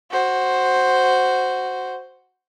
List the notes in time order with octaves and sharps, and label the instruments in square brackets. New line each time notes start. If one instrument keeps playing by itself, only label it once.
[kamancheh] F#4 C5